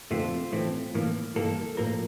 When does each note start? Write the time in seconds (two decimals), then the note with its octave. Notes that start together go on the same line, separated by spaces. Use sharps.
0.10 F2 D3 A3 C4 F4
0.52 A2 E3 A3 C4
0.94 A2 E3 A#3
1.36 G2 E3 A#3 A4
1.77 A2 F3 A#3 A#4